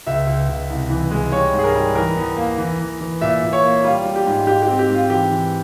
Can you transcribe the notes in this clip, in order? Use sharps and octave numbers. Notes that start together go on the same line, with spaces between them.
C#2 E5
C#2
C#2
C2
E3
G#3
G3 C#5
G#2
G#4
A#4
G3
E3 A#4
E2
A#3
E3
E3
E3
A#2 E5
A#2
C#5
A#3
G3 F4
G3
G4
G#2
G#2 G4
G4
C4
G4
G#2
F4
E3 G4
E3